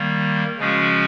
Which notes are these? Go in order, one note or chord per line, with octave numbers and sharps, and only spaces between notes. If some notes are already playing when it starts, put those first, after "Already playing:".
Already playing: D#3 G3 A#3
C#3 F3 G#3 C#4 F#4